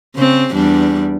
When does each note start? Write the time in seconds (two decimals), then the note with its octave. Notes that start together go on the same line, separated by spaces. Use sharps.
0.16 C#3 C4
0.52 E2 G3 D4